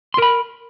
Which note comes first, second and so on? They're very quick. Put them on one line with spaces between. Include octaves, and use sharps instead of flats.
C6 A#4 B5